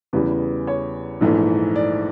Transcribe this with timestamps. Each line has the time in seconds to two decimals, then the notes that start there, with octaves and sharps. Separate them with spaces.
0.13 E2 C#3 E3 G3 B4
0.67 C#5
1.21 A#1 G#2 E3 A3
1.76 D5